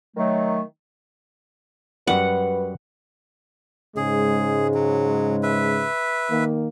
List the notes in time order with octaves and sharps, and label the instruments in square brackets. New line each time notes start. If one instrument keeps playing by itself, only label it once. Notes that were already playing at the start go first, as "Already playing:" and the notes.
[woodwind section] D#3 F#3 A3
[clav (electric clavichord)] F#2 G3 [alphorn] B4 [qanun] F#5
[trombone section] G#2 C#3 G#3 [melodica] G#4
[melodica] F#3
B4 E5
[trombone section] D#3 A#3